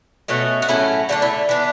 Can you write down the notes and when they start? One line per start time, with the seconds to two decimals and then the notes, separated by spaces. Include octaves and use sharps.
0.28 B2 A3 C#4 F#4
0.62 F#4
0.68 A2 F#3 A3 C#4 E4
1.09 D3 A3 D4 F#4
1.22 E4
1.49 E3 B3 D4